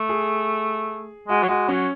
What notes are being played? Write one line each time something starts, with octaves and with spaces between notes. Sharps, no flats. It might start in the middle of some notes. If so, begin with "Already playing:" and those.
Already playing: A3
G#4
G#3 F#4
F#3
G#3 F#4
F#3 C#4